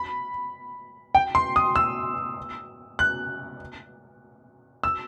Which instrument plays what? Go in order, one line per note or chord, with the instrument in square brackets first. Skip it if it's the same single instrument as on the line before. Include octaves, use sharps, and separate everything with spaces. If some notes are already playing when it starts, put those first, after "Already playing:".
Already playing: [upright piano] B5
G5
C6
D#6
E6
F#6
E6